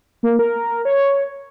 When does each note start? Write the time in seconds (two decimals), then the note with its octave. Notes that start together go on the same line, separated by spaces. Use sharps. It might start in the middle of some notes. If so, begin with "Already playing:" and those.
0.23 A#3
0.39 A#4
0.85 C#5